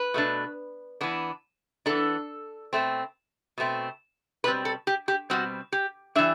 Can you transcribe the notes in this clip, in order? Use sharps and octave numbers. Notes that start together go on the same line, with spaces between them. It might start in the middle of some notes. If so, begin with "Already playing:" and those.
Already playing: B4
B2 A3 D4
E3 B3 D4
E3 B3 D4 A4
B2 A3 C4
B2 A3 C4
B2 G3 C4 B4
A4
G4
G4
B2 G3 C4 F#4
G4
E3 G3 D4 E5